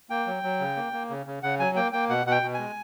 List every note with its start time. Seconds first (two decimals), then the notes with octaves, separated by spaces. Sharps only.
0.10 A#3 G5
0.27 F#3
0.43 F#3
0.60 C#3
0.77 A#3
0.93 A#3
1.10 C#3
1.26 C#3
1.43 C#3 F#5
1.59 F#3 G#5
1.76 A#3 G5
1.93 A#3 G5
2.09 B2 F#5
2.26 B2 F#5
2.31 G5
2.43 B2
2.54 G#3 G#5